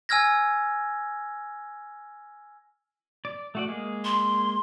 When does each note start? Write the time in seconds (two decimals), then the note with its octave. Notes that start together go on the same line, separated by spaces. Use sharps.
0.09 G#5 E6 F6 G#6 A#6
3.25 D5
3.55 A3 F#4 D5
3.68 G#3 A#3 G#4
4.05 C6